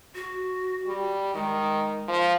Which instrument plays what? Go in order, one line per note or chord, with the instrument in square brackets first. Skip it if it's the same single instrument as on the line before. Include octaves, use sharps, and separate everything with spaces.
[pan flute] F#4
[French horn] G3
[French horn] D#3 [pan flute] G#3
[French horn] F3